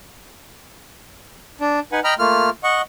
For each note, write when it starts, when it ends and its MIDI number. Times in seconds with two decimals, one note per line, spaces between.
1.61 1.80 62
1.92 2.00 63
1.92 2.00 71
1.92 2.00 78
1.92 2.00 80
2.04 2.14 75
2.04 2.14 79
2.04 2.14 82
2.04 2.14 83
2.04 2.14 89
2.19 2.50 57
2.19 2.50 58
2.19 2.50 65
2.19 2.50 89
2.64 2.82 75
2.64 2.82 78
2.64 2.82 85